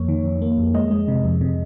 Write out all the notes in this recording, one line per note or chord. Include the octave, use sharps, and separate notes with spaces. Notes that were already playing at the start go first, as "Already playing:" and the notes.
Already playing: F2 A#3 C#5
D#3
F2
A#3
F2
G#3 D#5
G#3
C3
F2
C3